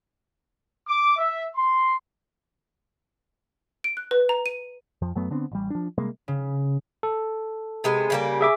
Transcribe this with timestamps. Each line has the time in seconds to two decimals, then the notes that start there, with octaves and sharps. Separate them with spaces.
0.88 D6
1.18 E5
1.56 C6
3.84 D7
3.97 F#6
4.11 B4
4.29 A#5
4.46 D#7
5.02 F2 F3
5.15 F#2 F#3 A3 B3
5.31 D3 B3 C4 D4
5.52 A1 G3
5.70 F3 D4
5.98 C3 G3 G#3 A#3
6.28 C#3
7.03 A4
7.84 C3 G#3 B3
8.10 C#3 G3 A#3
8.41 G#4 E5 D6